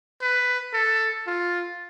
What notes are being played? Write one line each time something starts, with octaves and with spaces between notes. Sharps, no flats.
B4
A4
F4